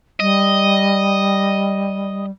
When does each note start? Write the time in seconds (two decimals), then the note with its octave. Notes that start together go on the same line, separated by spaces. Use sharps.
0.20 G3 D#5